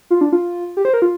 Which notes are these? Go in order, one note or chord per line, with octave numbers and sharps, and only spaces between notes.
F4
D4
F4
G4
C5
A#4
F4